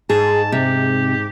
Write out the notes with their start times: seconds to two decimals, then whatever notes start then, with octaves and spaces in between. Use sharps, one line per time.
0.09 G#2 G#4 A5
0.52 C3 G4